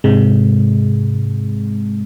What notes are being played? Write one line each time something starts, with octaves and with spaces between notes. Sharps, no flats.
G#2 C3 G#3